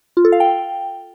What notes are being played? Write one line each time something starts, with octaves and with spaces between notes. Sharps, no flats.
F4
A4
F5
G5